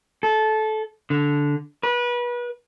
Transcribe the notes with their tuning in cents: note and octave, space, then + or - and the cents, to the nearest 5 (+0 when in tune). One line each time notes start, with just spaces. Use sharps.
A4 -20
D3 -10
B4 -30